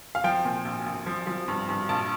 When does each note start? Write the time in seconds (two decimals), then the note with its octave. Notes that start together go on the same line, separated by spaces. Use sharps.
0.15 F5
0.24 F3 G5
0.45 A#2
0.65 A#1
0.86 A#1
1.06 F3
1.27 F3
1.48 G2
1.69 G2
1.89 A#1 A5